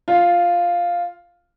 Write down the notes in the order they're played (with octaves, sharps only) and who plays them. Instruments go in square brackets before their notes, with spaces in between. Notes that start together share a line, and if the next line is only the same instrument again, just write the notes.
[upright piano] F4